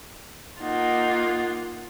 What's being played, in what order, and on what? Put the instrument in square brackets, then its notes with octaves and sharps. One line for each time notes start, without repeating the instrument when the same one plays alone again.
[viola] A#3 F4 [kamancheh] D#4 F#5